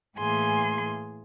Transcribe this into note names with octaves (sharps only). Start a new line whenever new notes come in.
A2 E3 A#3 G#4 G#5 C6